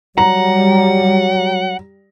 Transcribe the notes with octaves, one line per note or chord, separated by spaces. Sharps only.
F#3 G3 F#5 A#5